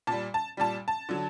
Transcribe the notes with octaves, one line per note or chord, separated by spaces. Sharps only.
A#2 G3 A5
A5
A#2 G3 A5
A5
D3 F#3